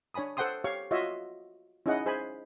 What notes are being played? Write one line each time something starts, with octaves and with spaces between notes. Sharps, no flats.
D4 C#5 G#5 B5 D#6
A4 C5 F#5 G5 C6 D#6
G4 C#5 F5 C#6
F4 F#4 C#5 D#5 E5
C#4 D#4 E4 G#4 D#5 F#5
G#4 C5 G#5 B5